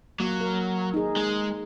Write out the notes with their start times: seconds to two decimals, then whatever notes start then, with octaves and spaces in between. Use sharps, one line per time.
0.20 F#3 A#3
0.41 A#4
0.94 D#4 G#4
1.16 G#3